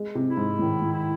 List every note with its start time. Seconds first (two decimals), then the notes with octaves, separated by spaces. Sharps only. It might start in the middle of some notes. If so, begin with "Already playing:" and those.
Already playing: G#3
0.15 C3
0.26 E4
0.37 G#2
0.59 A2 D#3
0.81 A2
0.92 E4